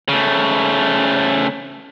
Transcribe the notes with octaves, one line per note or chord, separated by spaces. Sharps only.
C#3 A3